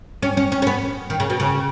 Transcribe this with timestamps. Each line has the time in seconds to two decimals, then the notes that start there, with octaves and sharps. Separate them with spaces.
0.23 C#4
0.37 C#4
0.52 C#4
0.62 C#4
0.67 B3
1.10 D#3
1.20 C#3
1.30 B2
1.40 C#3